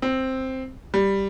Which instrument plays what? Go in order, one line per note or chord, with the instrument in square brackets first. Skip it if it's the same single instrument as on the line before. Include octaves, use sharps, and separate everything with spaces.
[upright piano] C4
G3